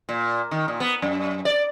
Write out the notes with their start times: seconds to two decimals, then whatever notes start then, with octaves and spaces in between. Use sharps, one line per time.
0.09 A#2
0.51 D#3
0.68 A#2
0.80 B3
1.02 F#2
1.45 D5